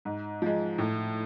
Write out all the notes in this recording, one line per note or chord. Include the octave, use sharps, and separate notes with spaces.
G#2
F3 G#3
A2